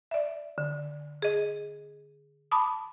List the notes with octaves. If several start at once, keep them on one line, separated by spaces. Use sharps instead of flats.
D5 E5
D3
G#4 D#5
A5 B5 D6 D#6